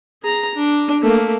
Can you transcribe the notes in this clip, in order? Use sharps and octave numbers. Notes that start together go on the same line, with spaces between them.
G#4 A#5
D4
A3 A#3